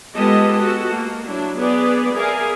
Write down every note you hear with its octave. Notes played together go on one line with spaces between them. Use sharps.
G#3 B3 F4 G4 A4 D#5
F#4 A4
A#3
F#3 D4 E4
B3 G#4 B4 D5
G#4 A#4 D5 E5 F5 G#5